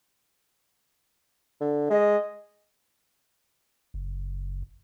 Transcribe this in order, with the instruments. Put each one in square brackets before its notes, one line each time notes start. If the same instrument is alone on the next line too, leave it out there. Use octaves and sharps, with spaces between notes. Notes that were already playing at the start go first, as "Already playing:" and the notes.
[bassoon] D3
[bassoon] G#3 [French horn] D#5
[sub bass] F#1